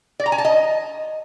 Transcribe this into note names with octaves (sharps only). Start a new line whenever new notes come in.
D5
A#5
G#5
A5
D#5